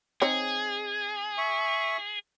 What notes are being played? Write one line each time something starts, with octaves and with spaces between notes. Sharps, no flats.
C4 D#4 G#4 C#5
E5 C#6